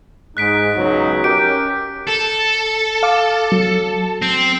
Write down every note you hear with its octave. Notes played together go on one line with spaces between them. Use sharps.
G#2 D#4 F#6 B6 D7
C#2 B2 F#3
C#4 G4 A#4 D7
A4
F5 D6
F#3
C4